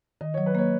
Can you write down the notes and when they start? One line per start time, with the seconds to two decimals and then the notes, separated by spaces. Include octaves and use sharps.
0.21 D#3 D#5
0.34 F#3 C#5
0.46 B4
0.55 A#3 C#5